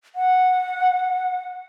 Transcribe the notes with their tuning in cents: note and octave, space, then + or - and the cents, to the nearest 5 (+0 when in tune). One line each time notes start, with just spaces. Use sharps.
F#5 -10